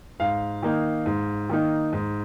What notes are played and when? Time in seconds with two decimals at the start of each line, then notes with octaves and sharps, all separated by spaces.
0.20 G#2 F5
0.63 D#3 A#3 D#4
1.06 G#2
1.49 D#3 A#3 D#4
1.93 G#2